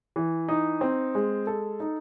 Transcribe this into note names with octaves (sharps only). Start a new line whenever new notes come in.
E3
D#4
C4
G#3
A4
D#4